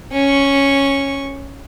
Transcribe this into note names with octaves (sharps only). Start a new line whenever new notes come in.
C#4 C#6